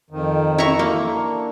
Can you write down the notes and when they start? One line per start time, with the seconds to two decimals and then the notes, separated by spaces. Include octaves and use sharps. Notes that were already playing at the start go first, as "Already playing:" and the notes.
0.10 F2 D#3
0.58 E4 A#5 C#6
0.79 A#3 A4 A#4
1.02 D4